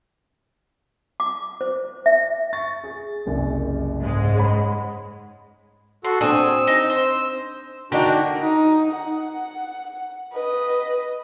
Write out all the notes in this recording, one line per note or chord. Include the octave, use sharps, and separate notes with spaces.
D6
C5
E5
C#6 A6
G#4
F#1 C2 F#2
G#2 G#3
C#5 F#5 B5
F#4 A4 C6
C4 D4 G#4 E6
D#4
C5
D3 D4 D#4 F#4 G4 A#4
D#4
F#5
B4 D#5